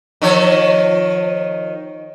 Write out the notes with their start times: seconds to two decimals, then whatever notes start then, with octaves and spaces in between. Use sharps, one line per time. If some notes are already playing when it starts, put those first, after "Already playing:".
0.22 D#3 F3 C#5